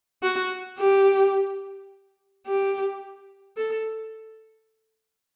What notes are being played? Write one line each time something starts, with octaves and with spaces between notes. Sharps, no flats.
F#4
G4
G4
A4